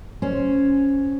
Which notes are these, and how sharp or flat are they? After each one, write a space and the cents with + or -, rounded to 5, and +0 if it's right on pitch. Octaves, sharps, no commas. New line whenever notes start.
C#4 +0 C5 +0